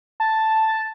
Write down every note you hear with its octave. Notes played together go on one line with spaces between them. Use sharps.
A5